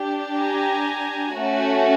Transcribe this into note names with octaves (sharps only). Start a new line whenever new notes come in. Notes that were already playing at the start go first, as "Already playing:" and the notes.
Already playing: D4 G4
G#5 A#5
A3 C#4 F#4